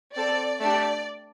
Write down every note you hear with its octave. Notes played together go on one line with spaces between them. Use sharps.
C4 A4 D5
A3 D4 G4 D5